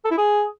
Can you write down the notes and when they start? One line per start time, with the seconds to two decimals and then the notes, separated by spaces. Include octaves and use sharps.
0.05 A4
0.11 E4
0.17 G#4